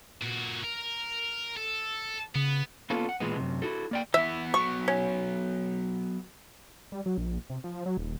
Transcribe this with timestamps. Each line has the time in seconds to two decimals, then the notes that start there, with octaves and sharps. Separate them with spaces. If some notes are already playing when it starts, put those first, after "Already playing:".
0.22 A#2 F#4
0.64 A#4
1.57 A4
2.35 C#3 B3
2.90 A#3 B3 C#4 F4 A4
3.09 F#5
3.20 A#2 E3 G#3 B3
3.36 F#2 C3
3.62 E4 F#4 A4
3.91 A#3 D5 G5
4.14 E3 B3 E5
4.54 F#3 B3 C#6
4.88 C#4
6.92 G3
7.06 F#3
7.18 A#1
7.50 C3
7.64 F3
7.86 F#3
7.97 D#1